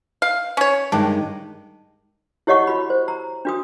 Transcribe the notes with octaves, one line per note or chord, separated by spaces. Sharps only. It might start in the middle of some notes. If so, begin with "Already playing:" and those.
F5
C#4 C#5
G2 D#3 G#3 D4
E4 G4 C#5 D#5 F#5 C#6
F#4 B5
C5
A#5
D4 F#4 D#6